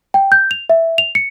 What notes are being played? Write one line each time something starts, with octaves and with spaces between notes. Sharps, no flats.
G5
G6
F7
E5
F7
C#7